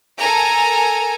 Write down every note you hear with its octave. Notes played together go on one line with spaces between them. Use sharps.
A4 A#4 G#5 A#5